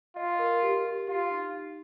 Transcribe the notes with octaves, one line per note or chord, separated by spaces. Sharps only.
F4 D#5
A#4
G4
G4
F4 G4
D#4
D#4